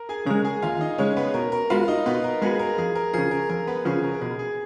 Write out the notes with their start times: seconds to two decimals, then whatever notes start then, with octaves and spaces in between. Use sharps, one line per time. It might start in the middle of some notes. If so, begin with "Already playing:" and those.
Already playing: A#4
0.09 G#4 G#5
0.26 C#3 G#3 A#4 A#5
0.44 G#4 G#5
0.62 D#2 F4 F5
0.81 D#4 D#5
0.98 C#3 G#3 C#4 C#5
1.16 B3 B4
1.34 B2 A#4
1.52 A#4
1.70 G#3 B3 F4 F#4 B4 F5
1.88 D#4 D#5
2.06 B2 B3 B4
2.24 A#4
2.42 G#3 B3 F#4 G#4 B4
2.59 A#4
2.78 F2 G#4
2.95 A#4
3.13 C#3 F3 G#4
3.31 A#4
3.49 F2 A#4
3.67 B3 B4
3.85 C#3 F3 G#4
4.04 A#4
4.14 A#4
4.21 B2 G#4
4.39 G#4